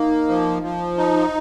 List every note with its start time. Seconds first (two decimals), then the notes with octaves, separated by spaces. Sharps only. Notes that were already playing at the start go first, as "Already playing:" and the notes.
Already playing: A#3 D#4
0.28 F3
0.62 F3
0.97 D#4